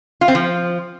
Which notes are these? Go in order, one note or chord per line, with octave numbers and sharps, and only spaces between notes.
F4
C4
F3